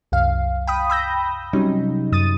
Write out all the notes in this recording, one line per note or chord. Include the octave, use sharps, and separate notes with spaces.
C2 F#2 F5
G5 B5 D#6
B5 E6 G6 A#6
C3 F#3 G3 C#4 D#4
F#2 D#6 A6 D#7